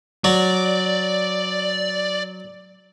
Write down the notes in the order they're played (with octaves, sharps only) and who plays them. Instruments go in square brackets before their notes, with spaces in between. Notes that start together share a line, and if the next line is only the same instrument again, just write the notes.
[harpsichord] F#3 [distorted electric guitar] D5